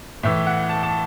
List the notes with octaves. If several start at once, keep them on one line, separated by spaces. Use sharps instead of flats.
A2 E3 E5
F#5
A5
A5